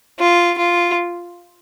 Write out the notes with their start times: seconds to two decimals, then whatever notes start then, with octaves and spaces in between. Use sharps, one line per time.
0.19 F4
0.58 F4